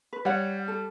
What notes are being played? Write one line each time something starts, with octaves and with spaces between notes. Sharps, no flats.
B4
G3 C#5 F#5
A4